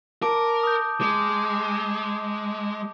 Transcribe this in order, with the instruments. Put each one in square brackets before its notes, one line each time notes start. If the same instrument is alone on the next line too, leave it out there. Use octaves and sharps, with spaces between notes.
[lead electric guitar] A#4 [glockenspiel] A5 D6 D7
[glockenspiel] D#6 G6
[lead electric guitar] G#3 [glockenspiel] D6